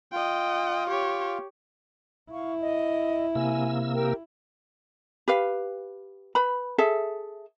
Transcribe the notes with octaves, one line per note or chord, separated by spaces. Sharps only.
F4 D#5 G5
G4 C#5
E4 F5 C#6
D#5
C3 A#3 G#5 E6
G4 A#4 G5
G4 B4 F5
B4 B5
G#4 A4 E5